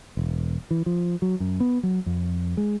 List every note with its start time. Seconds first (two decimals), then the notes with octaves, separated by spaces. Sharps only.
0.17 E1
0.71 E3
0.86 F3
1.22 F#3
1.40 F#2
1.60 B3
1.83 F#3
2.06 F2
2.57 G#3